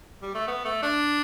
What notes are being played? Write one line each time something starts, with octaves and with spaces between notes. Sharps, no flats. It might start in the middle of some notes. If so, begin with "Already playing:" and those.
G3
A3
B3
A3
D4